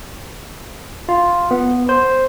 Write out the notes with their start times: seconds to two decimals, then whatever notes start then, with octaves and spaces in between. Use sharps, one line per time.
1.09 F4
1.51 B3
1.89 C5